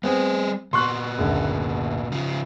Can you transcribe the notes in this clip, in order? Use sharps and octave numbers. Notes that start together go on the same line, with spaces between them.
G3 B3 C4 G#4 G#5
A#2 B3 C6 C#6 F#6
F#1 D2
C#3 F3